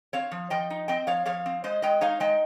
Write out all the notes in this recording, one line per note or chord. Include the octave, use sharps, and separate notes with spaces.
C4 C#5 F5
F3
F3 D#5 G5
D#4
C4 D#5 G5
F3 C#5 F5
F3 C#5 F5
C4
G#3 C5 D#5
G#3 D#5 G5
D#4 C#5 F5
G#3 D#5 G5